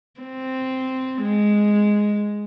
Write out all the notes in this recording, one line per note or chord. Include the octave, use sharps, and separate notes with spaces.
C4
G#3